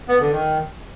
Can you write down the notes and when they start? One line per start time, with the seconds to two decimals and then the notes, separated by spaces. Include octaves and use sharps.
0.09 B3
0.20 D3
0.32 D#3